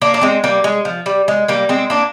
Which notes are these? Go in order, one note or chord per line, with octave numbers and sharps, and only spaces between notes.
A#3 D4
D4
G#3 C4
G3 A#3
G#3
F3
G3
G#3
G3 A#3
G#3 C4
A#3 D4